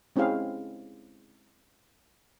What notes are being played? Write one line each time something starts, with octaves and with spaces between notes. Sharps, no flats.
G#3 C4 C#4 E4 G#4 F5